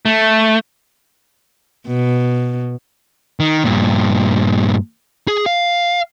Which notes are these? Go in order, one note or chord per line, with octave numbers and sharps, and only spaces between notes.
A3
B2
D#3
G2 A#2
G#4
F5